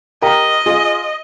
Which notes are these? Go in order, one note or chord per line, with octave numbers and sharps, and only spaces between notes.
G4 A#4 D#5
F4 G#4